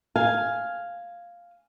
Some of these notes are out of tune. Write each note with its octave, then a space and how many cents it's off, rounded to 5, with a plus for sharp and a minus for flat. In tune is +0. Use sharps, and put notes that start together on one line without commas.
F5 +0 G#5 +0